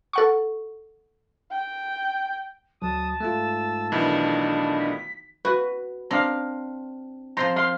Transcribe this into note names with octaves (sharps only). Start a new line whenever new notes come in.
A4 F#5 C#6
G5
D2 F#3 A5 D#6
G#2 A3 F4 E6
B1 D#3 E3 D4 D#5
B6
F#4 B4
C4 D4 F5 A#5
F3 C4 C5 A#5 C6
F5 C6